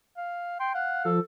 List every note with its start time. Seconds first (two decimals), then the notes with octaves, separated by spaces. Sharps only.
0.17 F5
0.60 G5 C6
0.75 F5 F#5
1.05 F3 A4